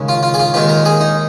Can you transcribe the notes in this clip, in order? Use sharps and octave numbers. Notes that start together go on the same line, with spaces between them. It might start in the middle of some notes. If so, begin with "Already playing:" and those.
Already playing: D#2 C#3 G#3
F4
F4
G#4
F4
D#2 D#3 G#3 F4
A#4
G#4
D#4